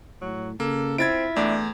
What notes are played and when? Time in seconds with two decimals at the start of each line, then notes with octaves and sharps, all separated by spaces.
0.21 A2 F#3
0.60 C#3 A#3 A4
0.98 C4 E4 F4 G#6 A6 D7
1.36 E2 A3 D4